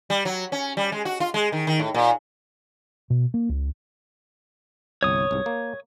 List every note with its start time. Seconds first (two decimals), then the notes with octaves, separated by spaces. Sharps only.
0.10 G3
0.25 F#3
0.52 C#4
0.77 G3
0.92 G#3
1.05 F#4
1.20 F4
1.34 G#3
1.52 D#3
1.67 D#3
1.79 A2
1.94 A#2
3.10 B2
3.34 A#3
3.49 C#2
5.03 G1 C2 C#5 D#6
5.31 C2 G#2
5.46 A#3